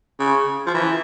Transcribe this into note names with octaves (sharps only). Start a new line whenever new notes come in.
C#3
F3
E3